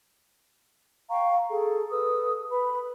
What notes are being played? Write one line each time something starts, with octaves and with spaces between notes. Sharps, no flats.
F5 G5 A#5 C#6
G#4 A4
A4 B4 D#6 E6
B4 B5